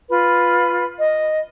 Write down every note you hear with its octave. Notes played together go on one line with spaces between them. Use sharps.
F4 B4
D#5